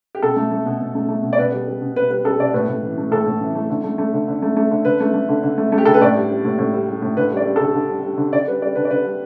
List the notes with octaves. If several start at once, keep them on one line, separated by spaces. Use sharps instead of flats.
G4
B2 A4
A3
A3
B2
B2
A3
A3
B2
D5
B2 B4
G3
G3
B2
B2 B4
G3 B4
G3 A4
B2 D5
A2 B4
A2
E3
A3
A2 A4
A2
E3
A3
D3
A3
A3
D3
D3
A3
A3
D3
D3 B4
A3
A3
D3
D3
A3
A3
G4
D3 A4
B4
A2 D5
G3
G3
A2
A2
G3
G3
A2
D3 B4
G3
D5
G3
D3 A4
D3
G3
G3
D3
D3 D5
G3 B4
G3 D5
D3 B4
D5
D3 B4
G3